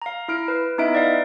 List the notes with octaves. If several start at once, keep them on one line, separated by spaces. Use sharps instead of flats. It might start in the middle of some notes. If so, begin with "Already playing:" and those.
F5 A#5
E4 F6 D7
B4
B3 D#4 E4 D#5 E5 D7
B4 D5 F5